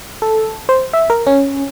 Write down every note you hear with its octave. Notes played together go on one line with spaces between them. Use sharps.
A4
C5
E5
A#4
C#4